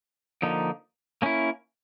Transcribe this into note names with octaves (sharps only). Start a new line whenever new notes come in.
D3 F3 A#3 D#4
A#3 C#4 E4